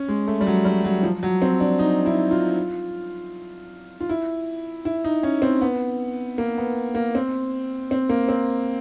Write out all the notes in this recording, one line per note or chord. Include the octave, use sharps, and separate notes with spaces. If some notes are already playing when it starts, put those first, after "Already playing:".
Already playing: C#4
G#3
A3
G3
F#3
G3
F#3
F3
F#3
C4
D4
D#4
E4
F4
F4
E4
E4
D#4
C#4
C4
B3
A#3
B3
A#3
C4
C4
A#3
C4